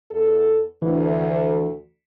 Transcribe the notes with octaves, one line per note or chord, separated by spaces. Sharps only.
E2 A4
D2 E3